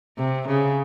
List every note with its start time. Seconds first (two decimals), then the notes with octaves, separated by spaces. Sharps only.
0.18 C3
0.48 C#3